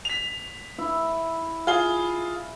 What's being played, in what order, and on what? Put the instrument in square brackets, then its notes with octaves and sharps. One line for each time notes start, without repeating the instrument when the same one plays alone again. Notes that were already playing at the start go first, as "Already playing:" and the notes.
[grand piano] B6 F7
[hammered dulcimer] E4
[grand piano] F4 G#4 G7